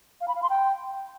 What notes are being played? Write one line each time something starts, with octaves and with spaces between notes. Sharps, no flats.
F5
B5
F5
C6
G5